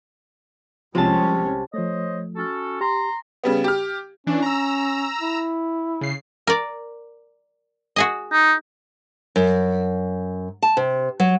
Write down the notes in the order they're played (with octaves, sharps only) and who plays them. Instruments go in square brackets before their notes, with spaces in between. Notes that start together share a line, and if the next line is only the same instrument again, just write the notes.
[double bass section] C2 G#3 C#4 [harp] C3 A5 [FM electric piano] F3
[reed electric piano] F3 A3 [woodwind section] C5 C#5 D#5
[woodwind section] C#4 F#4 A4
[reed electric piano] G4 [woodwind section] A#5 C6
[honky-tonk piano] C#3 G3 B3
G4 F6
[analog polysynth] E3 D4 [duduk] C#4
[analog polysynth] A#5 E6
[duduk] E4
[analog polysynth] C#3 C7
[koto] A#4 D5
F#4 G#4 D#5
[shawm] D#4
[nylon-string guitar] F#2
A5
C3
F#3